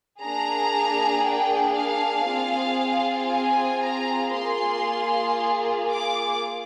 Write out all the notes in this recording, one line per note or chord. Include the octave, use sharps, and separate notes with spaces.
A#3 D4 G#4 A#5
G5
F5
C4 F4 G#4
G#5
A#5
A#3 F4 G#4 C6
D6